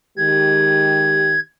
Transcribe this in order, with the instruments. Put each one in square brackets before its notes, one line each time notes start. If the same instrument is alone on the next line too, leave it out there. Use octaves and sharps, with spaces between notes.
[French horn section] D#3 G#3 G4 [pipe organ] G#6